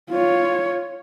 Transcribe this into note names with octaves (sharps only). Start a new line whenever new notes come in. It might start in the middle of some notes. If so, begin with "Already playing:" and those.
F4 C#5